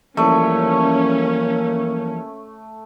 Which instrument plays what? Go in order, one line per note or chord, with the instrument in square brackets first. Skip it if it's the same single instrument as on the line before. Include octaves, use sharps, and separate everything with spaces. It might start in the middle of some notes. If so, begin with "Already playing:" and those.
[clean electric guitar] E3 F3 G3 [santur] A3 [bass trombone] A#3 [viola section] C#4